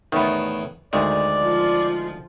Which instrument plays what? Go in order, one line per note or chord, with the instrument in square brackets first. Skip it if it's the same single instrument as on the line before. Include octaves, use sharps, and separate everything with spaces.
[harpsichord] E2 A2 [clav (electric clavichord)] D#3 B3
[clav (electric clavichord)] D2 D#3 [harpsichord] G#3 [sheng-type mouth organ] D5
[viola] F3 F4